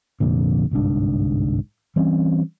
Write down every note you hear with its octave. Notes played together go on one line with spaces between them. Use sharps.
F1 F2 A#2 D3
G1 C2 G#2 D4
E3 G3 C4 C#4